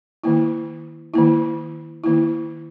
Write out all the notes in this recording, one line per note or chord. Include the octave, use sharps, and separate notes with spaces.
D#3 A#3 E4
D#3 A#3 E4
D#3 A#3 E4